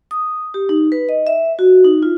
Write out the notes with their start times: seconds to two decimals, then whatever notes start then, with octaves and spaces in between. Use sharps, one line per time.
0.11 D#6
0.54 G4
0.69 D#4
0.92 B4
1.09 D#5
1.27 E5
1.59 F#4
1.85 D#4
2.03 F4